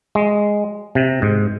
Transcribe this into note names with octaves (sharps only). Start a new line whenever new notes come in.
G#3
C3
G#2